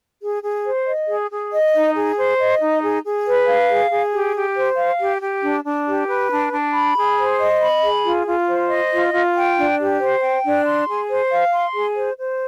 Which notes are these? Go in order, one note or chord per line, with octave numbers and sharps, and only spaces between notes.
G#4
G#4
C5
D#5
G#4
G#4
D#5
D#4
G#4
C5
D#5
D#4
G#4
G#4
B4
F5
G#4
G#4
G4
G4
C5
F5
G4
G4
D4
D4
G4
B4
D4
D4
B5
G#4
C5
D#5
B5
G#4
F4
F4
C5
D#5
F4
F4
G5
D4
G4
C5
G5
D4
C6
G#4
C5
F5
C6
G#4
C5
C5